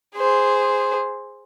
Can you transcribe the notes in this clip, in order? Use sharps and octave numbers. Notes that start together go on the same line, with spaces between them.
G#4 C5